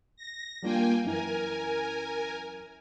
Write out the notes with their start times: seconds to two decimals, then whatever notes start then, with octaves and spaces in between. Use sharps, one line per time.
0.17 A#6
0.62 G3 A#3 D4 F4 G5 G#5
1.04 F#2 E3 A#4 G#5